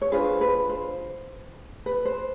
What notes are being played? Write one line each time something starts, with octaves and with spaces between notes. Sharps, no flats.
C#5
D4 F4 G#4 B4 C5
B4
C5
B4
C5